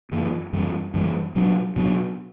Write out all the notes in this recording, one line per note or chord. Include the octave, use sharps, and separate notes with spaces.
F#2 E3 A#3
F#2 E3 G3
F#2 E3 G3
B2 F#3 B3 D4
B2 F#3 B3 D4